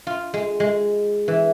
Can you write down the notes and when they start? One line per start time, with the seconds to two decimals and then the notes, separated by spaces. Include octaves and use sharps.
0.07 F4
0.34 G#3
0.60 G#3
1.28 E3